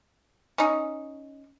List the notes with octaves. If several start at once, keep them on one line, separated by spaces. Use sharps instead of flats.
C#4 D#4